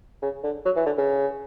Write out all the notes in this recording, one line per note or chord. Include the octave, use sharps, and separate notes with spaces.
C#3
D3
F#3
E3
D3
C#3